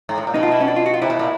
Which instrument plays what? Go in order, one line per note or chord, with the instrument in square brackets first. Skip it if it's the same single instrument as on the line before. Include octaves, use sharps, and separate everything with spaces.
[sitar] G#2
A2
A#2
[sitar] B2 [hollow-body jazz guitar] D#4
[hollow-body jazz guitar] F4
E4
C#4
D4
F4
F#4
F4
[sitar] C3 [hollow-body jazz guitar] E4
[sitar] B2
A#2